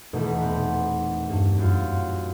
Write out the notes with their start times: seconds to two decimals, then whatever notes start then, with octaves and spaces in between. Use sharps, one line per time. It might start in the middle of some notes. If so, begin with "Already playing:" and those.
0.13 D#1 E2 B2 A3 D#4
0.42 B3 C4
1.30 G2
1.58 F#2 F4